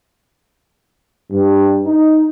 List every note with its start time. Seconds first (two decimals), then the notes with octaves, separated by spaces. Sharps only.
1.32 G2
1.85 D#4